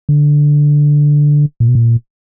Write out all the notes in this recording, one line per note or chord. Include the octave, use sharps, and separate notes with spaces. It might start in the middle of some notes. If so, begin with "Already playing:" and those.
D3
A#2
B2
A#2